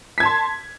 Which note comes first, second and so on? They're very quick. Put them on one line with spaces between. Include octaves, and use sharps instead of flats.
B6 G#6 A5 C6